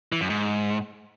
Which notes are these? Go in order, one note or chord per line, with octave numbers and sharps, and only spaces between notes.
E3
F#2
G#2